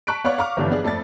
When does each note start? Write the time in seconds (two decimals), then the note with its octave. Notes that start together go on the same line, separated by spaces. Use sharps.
0.07 A5 A#5 C#6 F#6 B6 D7
0.24 B3 C#5 D5 F5 F#5 C#6
0.38 F5 A#5 C#6 D6 F6
0.57 G1 G2 D3 E3 F3
0.70 B3 D4 G#4
0.84 F2 A3 A4 D5 A6